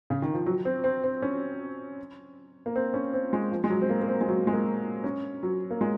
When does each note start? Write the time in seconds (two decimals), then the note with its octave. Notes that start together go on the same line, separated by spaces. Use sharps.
0.10 C#3
0.22 D#3
0.33 F3
0.46 F#3
0.65 C4
0.84 C4
1.04 C4
1.22 C#4
2.66 A#3
2.76 C4
2.94 C#4
3.14 C4
3.33 G#3
3.52 F3
3.64 G#3
3.70 F#3
3.82 C4
3.90 A#3
4.02 A#3
4.08 C4
4.21 G#3
4.28 F#3
4.47 G#3
4.53 A#3
5.04 C#4
5.43 F#3
5.71 A#3
5.81 G#3